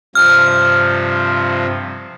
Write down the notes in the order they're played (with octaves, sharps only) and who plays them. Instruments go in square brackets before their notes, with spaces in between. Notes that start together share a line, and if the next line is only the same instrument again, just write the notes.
[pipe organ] G2 C3 F3 [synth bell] F6